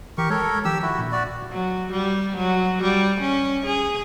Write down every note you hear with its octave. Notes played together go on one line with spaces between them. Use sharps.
E3 G4 A#4 C#6
G#3 A4 A#4 C#5
D#3 F3 G4 E6
E4 F#4
A#2 D4
F#4 D5
F#3
G3
F#3
G3
C#4
G#4